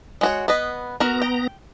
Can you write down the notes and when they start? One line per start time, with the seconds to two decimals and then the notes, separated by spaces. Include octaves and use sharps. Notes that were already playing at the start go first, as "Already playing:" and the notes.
0.21 G#3 F#4 C#5
0.48 B3 B4 D#5
1.00 B3 F#4 A#4 A#5
1.22 G5